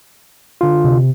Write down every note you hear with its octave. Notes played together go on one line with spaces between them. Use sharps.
D3 F4
C3